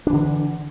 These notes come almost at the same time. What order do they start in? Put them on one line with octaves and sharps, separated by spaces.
D4 E3 D3